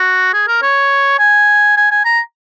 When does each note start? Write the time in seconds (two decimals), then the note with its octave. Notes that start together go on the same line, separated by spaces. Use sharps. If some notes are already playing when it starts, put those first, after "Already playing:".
Already playing: F#4
0.33 G#4
0.48 A#4
0.62 C#5
1.19 G#5
1.77 G#5
1.91 G#5
2.05 A#5